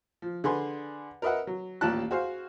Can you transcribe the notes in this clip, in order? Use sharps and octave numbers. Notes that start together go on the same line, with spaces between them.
F3
D3 G#4 B4 C6
A#4 B4 D#5 E5 F#5
F#3
A1 D#2 A#2 F4 A5 F#6
F#4 G#4 C5 F5